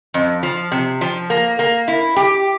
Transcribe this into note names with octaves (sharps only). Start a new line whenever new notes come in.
F2
F3
C3
F3
A#3
A#3
E4
G4